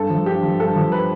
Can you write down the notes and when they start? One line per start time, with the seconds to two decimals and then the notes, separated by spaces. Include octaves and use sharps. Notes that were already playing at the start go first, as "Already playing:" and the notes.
Already playing: G2 A4
0.10 F3
0.26 G2 G4
0.43 F3
0.59 G2 A4
0.76 F3
0.92 B4